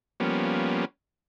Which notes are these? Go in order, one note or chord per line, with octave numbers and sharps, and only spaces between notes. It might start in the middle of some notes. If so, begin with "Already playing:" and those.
F3 G3 A#3 B3 C#4